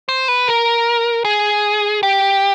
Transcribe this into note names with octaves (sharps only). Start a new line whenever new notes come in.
C5
B4
A#4
G#4
G4